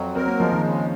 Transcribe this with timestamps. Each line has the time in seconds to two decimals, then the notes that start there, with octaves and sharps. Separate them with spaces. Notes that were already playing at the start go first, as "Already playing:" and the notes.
Already playing: F2 F#3
0.15 C4 A#4
0.27 A#3
0.40 F3 G#3
0.52 D#3
0.63 C#3